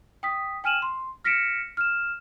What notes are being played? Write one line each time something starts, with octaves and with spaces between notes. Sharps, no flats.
G5 D#6 B6
G5 G#5 F6 D#7 E7 F#7
C6
F6 A#6 B6 C#7 D7 E7
F6 E7